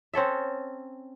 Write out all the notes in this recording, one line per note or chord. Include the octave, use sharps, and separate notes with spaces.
C4 C#4 A4 E5